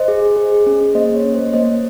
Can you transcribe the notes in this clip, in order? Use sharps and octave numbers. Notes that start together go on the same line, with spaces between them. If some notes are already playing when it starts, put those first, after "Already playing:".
Already playing: C5 D#5
G#4
G#4
G#4
G#4
C#4
G#4
A#3 C5 D#5
A#3 C#5
C#4
A#3 C5 D#5
A#3 C5 D#5
A#3